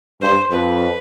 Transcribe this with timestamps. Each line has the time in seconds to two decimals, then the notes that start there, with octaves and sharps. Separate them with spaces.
0.21 G2 C5
0.51 F2 B4